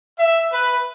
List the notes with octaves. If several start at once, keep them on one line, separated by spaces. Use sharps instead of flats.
E5
B4